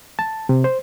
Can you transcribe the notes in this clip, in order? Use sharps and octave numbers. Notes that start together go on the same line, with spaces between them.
A5
C3
C5